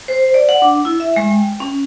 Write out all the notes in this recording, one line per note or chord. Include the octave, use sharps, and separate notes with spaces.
C5
D5
F#5
D4
E4
E5
G#3
G5
C#4